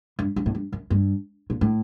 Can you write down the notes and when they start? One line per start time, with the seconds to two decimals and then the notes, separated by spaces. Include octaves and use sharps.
0.19 G2
0.36 G2
0.46 A2
0.55 G2
0.72 F#2
0.90 G2
1.50 A#2
1.61 A2